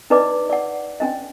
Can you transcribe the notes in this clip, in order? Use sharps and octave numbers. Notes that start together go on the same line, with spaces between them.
D4 D#4 B4 D5 D#5 D6
D5 F#5
C#4 D4 D#5